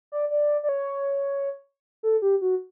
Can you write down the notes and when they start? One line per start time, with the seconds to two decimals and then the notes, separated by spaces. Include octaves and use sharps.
0.12 D5
0.30 D5
0.63 D5
0.69 C#5
2.03 A4
2.22 G4
2.41 F#4